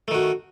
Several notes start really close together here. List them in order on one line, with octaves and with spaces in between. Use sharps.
A3 D#3 F#4